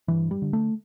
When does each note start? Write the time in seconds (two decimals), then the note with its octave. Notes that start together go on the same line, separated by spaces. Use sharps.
0.08 G2 E3
0.31 G3
0.42 D3
0.53 A3